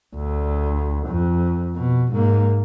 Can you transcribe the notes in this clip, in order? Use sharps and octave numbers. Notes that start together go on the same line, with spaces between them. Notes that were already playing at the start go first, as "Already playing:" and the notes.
D2
F2
B2
G#2 A#3